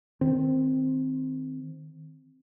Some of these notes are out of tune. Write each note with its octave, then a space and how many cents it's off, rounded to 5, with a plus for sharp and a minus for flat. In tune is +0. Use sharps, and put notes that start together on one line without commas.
D#3 +0 C4 +0